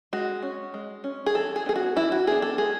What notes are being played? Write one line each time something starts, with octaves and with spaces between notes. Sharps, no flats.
G#3 F#4
C#4
G#3
C#4
G#4
E3 A4
G#4
B3 D4 G#4
F#4
E3 E4
F#4
B3 D4 G#4
A4
G#3 G#4